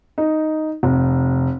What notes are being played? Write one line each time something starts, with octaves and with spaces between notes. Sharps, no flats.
D#4
F1